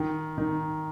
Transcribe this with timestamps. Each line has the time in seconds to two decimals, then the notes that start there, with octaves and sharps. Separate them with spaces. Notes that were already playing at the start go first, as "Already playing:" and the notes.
Already playing: D#3
0.38 D#3